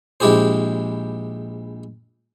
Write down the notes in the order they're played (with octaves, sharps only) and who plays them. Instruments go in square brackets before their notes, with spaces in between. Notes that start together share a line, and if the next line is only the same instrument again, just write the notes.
[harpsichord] A#1 G#3 E4 G4 G#4 C5